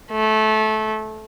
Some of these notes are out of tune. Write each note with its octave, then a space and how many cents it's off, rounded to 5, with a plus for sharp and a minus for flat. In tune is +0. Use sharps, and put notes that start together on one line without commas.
A3 -20